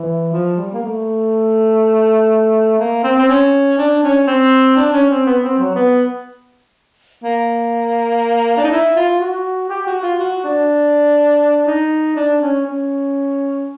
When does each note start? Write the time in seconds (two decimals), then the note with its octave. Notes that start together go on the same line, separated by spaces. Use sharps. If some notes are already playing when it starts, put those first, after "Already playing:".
Already playing: E3
0.32 F3
0.57 G3
0.73 A#3
0.82 A3
2.79 A#3
3.04 C4
3.18 C4
3.28 C#4
3.78 D4
4.03 C#4
4.27 C4
4.76 D4
4.92 C#4
5.10 C4
5.26 B3
5.43 C4
5.58 F#3
5.75 B3
7.23 A#3
8.57 D4
8.64 D#4
8.71 E4
8.96 F4
9.20 F#4
9.70 G4
9.87 F#4
10.03 F4
10.19 F#4
10.44 D4
11.67 D#4
12.16 D4
12.41 C#4
12.66 C#4